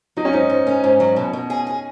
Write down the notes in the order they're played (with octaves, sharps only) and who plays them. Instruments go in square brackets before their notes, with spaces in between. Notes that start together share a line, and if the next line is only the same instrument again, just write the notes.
[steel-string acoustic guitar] F#3 [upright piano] D#4
[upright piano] C#4
[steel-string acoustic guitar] G#2 [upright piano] D#4
[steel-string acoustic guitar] G#2
C#4
G#2
F#3
B2
B2
G#4
G#4